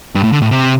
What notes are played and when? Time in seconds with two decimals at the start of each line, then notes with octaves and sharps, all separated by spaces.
0.15 G2
0.24 A2
0.33 D3
0.42 A2
0.51 C3